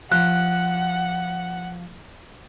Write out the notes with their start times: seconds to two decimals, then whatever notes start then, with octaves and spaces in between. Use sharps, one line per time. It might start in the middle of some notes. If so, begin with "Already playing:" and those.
0.12 F3 F#5 F#6